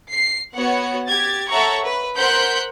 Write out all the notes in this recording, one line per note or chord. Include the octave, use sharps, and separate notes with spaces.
C7
B3 F#4 C#5 F#5 C#7
G4 G#6 A6
A4 C#5 E5 F#5 A#5 C#6
B4
A#4 C5 F#5 F#6 G6 B6